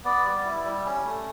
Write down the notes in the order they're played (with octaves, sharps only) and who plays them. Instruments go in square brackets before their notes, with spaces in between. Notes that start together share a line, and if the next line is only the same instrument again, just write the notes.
[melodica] B3 D5
G3
E4
G3
C#4
A3